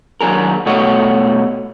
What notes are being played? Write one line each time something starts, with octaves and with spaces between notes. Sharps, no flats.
D#2 F#3 D4 G#4 A#4
B2 G3 A3 F#4 C#5 D#5